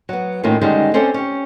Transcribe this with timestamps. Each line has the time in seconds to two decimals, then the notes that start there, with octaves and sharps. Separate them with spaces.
0.09 F#3 B3
0.43 A2 D#3 A#3 C#4 E4 F4
0.61 D3 D#3 G3 G#3 C#4
0.94 C4 C#4 A4 C5 D5
1.14 C#4 G4